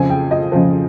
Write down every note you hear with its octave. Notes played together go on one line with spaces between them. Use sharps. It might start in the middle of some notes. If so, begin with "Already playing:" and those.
Already playing: F2 C#3 F3 G#5
G5
D#5
F2 C#3 F3